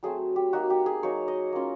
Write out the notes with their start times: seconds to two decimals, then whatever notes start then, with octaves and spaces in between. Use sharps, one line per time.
0.03 F#3 A3 C4 G#4
0.36 G4
0.53 A#3 D#4 F#4
0.70 G4
0.86 G#4
1.03 F#3 A#3 D#4 C#5
1.28 D#5
1.53 A#3 C#4 F4